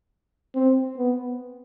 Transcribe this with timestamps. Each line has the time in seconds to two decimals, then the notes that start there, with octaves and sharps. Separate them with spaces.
0.55 C4
0.98 B3